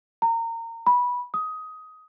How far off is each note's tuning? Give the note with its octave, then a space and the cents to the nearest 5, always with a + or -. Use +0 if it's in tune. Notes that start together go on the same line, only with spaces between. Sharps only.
A#5 -25
B5 -15
D#6 +15